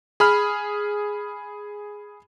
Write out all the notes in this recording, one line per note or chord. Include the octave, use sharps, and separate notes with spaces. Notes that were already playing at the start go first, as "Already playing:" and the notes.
G#4 B5 F6